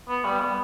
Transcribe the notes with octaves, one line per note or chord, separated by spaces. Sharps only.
B3
G3
B3